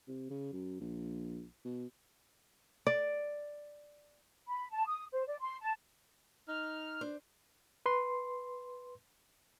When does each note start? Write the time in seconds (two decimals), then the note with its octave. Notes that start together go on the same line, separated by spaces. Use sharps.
0.08 C3
0.30 C#3
0.53 F#2
0.80 A#1
1.65 B2
2.87 D5
4.47 B5
4.72 A5
4.86 D#6
5.12 C5
5.27 D5
5.41 C6
5.60 A5
6.48 D#4 F6
7.01 D4 C5
7.86 B4 C6